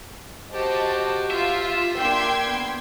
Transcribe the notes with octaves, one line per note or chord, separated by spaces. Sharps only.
F#4 G4 C5 D#5 A5
F4 E5
A#3 D4 G5 C6 G#6
B3